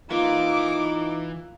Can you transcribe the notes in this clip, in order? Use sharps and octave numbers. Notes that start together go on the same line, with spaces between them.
E3 A#3 D#4 F4 D6